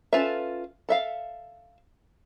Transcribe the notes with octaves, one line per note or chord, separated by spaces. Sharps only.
C#4 F4 A4 B4 E5
A4 E5 F5